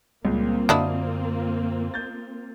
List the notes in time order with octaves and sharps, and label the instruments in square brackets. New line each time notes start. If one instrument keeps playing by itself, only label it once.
[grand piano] C#2 A#2 [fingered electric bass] G3 [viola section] A#3 C4 F4
[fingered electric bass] F#2 D3 [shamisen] F#3 D4 E4 [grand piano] D#5 F5 D#6
[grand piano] G6 A6